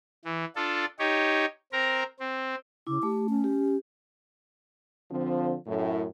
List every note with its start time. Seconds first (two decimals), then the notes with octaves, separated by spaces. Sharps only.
0.25 E3
0.56 D4 F4 A4
0.99 D#4 G4 C#5
1.72 C4 A#4 A#5
2.20 C4
2.87 C#3 E4 D6
3.03 A3 G4
3.29 C#4
3.44 G4
5.11 D3 F3 C4
5.67 F#2 A2